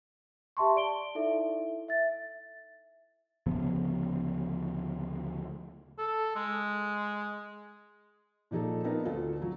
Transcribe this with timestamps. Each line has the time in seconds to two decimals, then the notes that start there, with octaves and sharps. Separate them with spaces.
0.57 G4 E5 A5 C6 C#6
0.76 D5 D7 G7
1.15 D#4 E4 A4 E5
1.88 E5 A6
3.46 D2 C#3 F3 B3
5.98 A4
6.36 G#3
8.51 A#2 F3 D#4 G#4 A4
8.84 B3 C4 D4 D#4 A#4
9.05 D2 F4 A4 A5
9.42 F#3